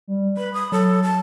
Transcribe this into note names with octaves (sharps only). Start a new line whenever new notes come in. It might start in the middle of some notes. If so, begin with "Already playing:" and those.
G3
B4 B5
D#6
F#3 A4
A5